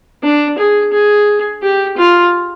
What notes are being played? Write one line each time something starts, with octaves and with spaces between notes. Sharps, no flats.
D4
G#4
G#4
G4
F4